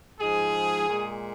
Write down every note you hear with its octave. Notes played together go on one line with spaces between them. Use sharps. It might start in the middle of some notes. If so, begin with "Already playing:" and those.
G#2 F3 G#3 G#4
A#2 G#3